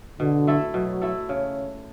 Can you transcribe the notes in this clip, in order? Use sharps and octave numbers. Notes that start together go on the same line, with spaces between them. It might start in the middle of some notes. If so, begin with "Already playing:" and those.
B2 D3
A3 E4 A4
B2 F#3
A3 E4 A4
C#3